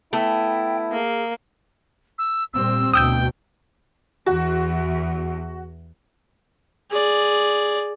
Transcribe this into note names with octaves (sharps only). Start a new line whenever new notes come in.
A3 B3 E4 G5
A#3 G#4
E6
A#2 G3 C4 E6
D2 B2 G5 D#6 E6 G6
E2 F#4
G#4 D5